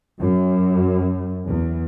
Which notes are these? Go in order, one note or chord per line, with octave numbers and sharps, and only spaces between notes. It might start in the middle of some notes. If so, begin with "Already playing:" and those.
F#2
E2